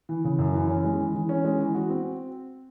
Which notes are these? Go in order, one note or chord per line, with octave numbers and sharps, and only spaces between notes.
E3
C#3
F#2
E3
C#4
G#3
E3
E3
C#4
G#3
E3
F#4
C4